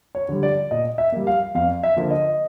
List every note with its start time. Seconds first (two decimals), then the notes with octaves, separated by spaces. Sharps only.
0.15 C#5
0.29 D3 G3
0.43 D5
0.71 A#2 D#5
0.98 E5
1.12 G3 A#3
1.27 F5
1.55 F2 F5
1.83 E5
1.97 D3 F3 A#3
2.11 D#5